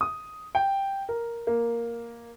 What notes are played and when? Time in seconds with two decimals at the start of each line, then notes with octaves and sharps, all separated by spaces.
0.01 D#6
0.55 G5
1.09 A#4
1.47 A#3